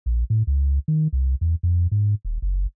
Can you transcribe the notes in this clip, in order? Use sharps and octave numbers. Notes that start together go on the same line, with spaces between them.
A#1
A2
C#2
D#3
C2
E2
F2
G#2
D#1
F#1